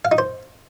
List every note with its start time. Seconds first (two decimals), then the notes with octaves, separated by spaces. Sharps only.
0.05 F5
0.12 D#4
0.18 C5